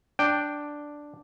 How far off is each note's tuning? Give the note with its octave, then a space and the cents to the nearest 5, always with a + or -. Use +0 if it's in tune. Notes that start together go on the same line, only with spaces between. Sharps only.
D4 +0 G5 +0